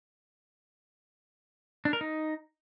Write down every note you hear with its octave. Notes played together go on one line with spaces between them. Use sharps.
D4
A#4
D#4